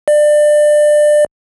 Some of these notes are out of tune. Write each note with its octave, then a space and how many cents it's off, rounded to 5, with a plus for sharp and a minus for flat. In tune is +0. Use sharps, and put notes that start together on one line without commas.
D5 +25